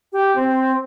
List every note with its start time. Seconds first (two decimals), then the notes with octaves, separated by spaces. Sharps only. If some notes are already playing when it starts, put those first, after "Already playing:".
0.13 G4
0.36 C4